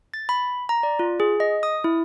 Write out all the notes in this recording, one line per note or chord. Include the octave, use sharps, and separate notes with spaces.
A6
B5
A#5
D5
F4
G#4
D#5
D#6
E4